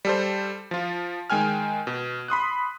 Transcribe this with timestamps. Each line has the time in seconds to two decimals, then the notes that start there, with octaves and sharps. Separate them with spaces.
0.05 G3 A4 C5
0.71 F3 F4
1.30 D#3 G#3 G5 G#5 F6
1.87 B2
2.28 B5 C6 D#6 F#6